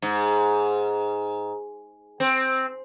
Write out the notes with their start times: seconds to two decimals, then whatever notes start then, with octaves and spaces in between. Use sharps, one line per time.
0.02 G#2
2.20 C4